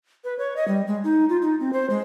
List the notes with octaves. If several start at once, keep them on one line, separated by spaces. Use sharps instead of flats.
B4
C#5
D#5
G3
G#3
D#4
F4
D#4
C4
C5
G#3